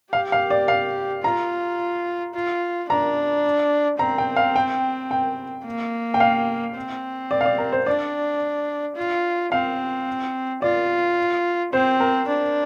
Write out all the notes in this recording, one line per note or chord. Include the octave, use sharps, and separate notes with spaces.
G4 F5
F5
D5
F5
F4 A#5
F4
D4 A#5
C4 A#5
G5
F5
G5
G5
A#3
G5
F5
C4
D5
F5
D5
A#4
C5
D4 D5
F4
C4 F5
F4 D5
C4 C5
A#4
D4